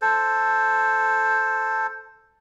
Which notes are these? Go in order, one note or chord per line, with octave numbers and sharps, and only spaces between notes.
A4 C5